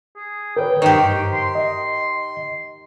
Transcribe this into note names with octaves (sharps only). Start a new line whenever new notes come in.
G#4
A#4 B4 C#5 G5
G2 D#3 G4 C5 C#6
C6
D#5